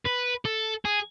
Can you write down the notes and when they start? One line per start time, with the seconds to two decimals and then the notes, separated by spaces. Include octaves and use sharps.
0.05 B4
0.45 A4
0.85 G#4